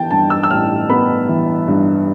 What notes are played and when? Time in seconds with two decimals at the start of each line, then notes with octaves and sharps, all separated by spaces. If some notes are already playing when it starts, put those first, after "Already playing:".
Already playing: E3 B3 G5 A5
0.11 G2 A5
0.30 E6
0.43 E6
0.50 A1 F6
0.90 B3 B5
1.29 E3
1.68 G2